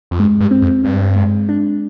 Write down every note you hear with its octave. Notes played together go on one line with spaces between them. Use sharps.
F2
G2 G#3
G2
C4
F2
G2 C4
G#3
D4